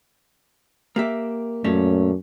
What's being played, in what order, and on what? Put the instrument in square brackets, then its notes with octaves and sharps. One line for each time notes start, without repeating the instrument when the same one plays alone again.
[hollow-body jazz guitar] A#3 G4 E5
[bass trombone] F#2 [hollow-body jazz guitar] A#2 A3 C#4